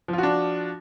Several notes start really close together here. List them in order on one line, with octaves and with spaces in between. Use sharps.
F3 F4 F#4 D4